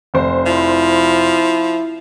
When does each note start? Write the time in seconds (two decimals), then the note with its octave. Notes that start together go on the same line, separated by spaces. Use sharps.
0.14 F1 C5
0.46 F3 E4